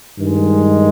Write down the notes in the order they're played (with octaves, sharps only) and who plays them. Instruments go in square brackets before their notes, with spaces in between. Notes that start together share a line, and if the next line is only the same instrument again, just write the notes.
[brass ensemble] G2 D#3 G#3